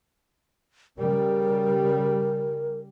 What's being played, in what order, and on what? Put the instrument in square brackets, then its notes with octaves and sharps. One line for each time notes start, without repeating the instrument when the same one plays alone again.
[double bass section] C#3 G3 [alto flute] A#4